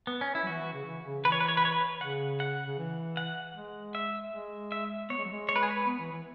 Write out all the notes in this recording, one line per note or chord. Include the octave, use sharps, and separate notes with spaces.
B3
C#4
E4
F#3
E3 F#4
E3
C#3
E3
C#3
E3 B4
C#5
B4
C#5
B4
C#5
B4
C#3 F#5
F#5
C#3
E3
F#5
G#3
E5
G#3
E5
B3 C#5
G#3
F#3
G#3
C#5
B4
G#4
B4
B3
E3
E3